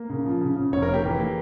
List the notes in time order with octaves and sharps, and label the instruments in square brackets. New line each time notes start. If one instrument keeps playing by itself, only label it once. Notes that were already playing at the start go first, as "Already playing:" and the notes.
Already playing: [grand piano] A#3
C#3
F3
C#3
C#3
F1 C#5
A#4
A#3
G4
E3
A#3